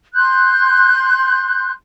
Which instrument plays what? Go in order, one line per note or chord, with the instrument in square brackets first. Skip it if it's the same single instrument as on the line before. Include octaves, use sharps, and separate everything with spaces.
[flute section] C6 F#6 G6